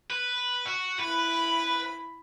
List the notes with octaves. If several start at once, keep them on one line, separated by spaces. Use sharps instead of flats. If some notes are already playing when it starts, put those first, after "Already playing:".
B4
F#4
E4 B4 B5